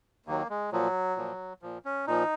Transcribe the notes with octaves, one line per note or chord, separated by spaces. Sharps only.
D#2 D#3 F#3 A#3
G#3
A#2 F3 F#3
A#2 F3
A#2 F3
C#4
A#2 F3 D#4